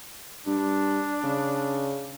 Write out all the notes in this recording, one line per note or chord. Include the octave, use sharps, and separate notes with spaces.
G2 D4
C#3